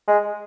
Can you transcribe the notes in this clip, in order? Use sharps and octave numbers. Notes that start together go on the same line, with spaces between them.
G#3